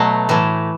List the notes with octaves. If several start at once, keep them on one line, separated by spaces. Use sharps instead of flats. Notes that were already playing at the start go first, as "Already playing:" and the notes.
Already playing: B2 F#3 A3
A2 E3 A3